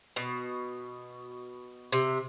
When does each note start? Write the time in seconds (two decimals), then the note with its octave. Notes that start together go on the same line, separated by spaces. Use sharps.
0.16 B2
1.92 C3